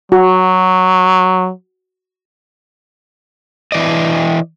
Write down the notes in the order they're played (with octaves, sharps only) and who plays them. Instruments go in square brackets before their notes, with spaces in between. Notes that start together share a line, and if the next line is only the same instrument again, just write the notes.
[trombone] F#3 [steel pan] F#4
[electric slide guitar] E3 D5 D#5